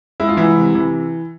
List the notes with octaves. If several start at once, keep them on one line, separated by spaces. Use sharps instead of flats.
G#3 E4
F4
C2 E3 E4
C3
E3